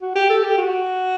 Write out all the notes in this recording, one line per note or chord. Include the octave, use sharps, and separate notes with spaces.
F#4
G4
A4
G4
F#4